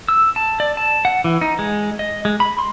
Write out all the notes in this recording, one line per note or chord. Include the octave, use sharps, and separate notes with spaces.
E6
A5
D5
A5
F#5
E3
D#4
G#3
D#5
G#3
B5
C6